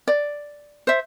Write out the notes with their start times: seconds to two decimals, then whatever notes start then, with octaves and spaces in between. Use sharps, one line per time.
0.08 D5
0.87 C5 E5